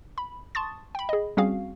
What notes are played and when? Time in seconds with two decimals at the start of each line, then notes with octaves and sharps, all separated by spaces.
0.18 B5
0.55 A5 C6 C#6 D#6 A6
0.95 G5 B5
1.09 G#4 D#5
1.37 G3 C4 C#4 F#4 G#4 F5